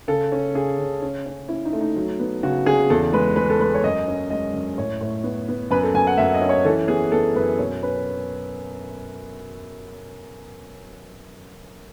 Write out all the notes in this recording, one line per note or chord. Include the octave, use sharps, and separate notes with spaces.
C#3 A4
C#4
C#3 G#4
C#3
C#4
C#4
C#4 E4
D#4
A3
D#4
F#3
B3
C#3 F#4
C#3 G#4
E2 A4
G#3 B4
G#3 B4
A4
G#3 B4
C#5
F#2 D#5
C#4
G#3 D#5
F#2
A2 C#5
A2
B3
B3
F#2 B4
A4
F#2 G#5
F#5
F#2 E5
D#5
C#4
C#5
E3 A4
B3 G#4
B3 A4
F#2 B4
B2 C#5
C#4 B4